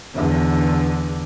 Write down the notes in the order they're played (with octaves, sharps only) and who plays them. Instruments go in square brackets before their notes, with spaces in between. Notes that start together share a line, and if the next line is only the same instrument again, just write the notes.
[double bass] E2 D3